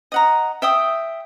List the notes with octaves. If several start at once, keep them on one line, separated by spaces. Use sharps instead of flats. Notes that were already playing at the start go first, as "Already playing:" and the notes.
D#5 F#5 A#5
E5 G5 D#6